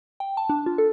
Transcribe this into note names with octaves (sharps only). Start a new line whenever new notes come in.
G5
A5
D4
F4
A4